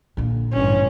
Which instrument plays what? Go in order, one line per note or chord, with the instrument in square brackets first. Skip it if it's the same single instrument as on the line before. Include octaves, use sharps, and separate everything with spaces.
[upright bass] A#2 D3
[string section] A1 G2 [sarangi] C#4